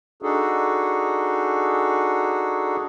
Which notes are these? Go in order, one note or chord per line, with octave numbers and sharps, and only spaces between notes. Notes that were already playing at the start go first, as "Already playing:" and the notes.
D4 D#4 F#4 G#4 A4